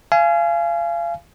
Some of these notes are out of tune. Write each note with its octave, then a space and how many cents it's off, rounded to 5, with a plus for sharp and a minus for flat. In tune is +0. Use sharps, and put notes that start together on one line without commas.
F5 -30 G#5 +15